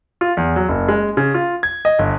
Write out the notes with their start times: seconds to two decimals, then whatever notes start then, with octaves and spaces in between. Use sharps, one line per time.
0.21 F4
0.37 E2
0.56 F#3
0.69 F#1
0.88 G#3
1.17 C#3
1.34 F4
1.63 G#6
1.85 D#5
1.99 G1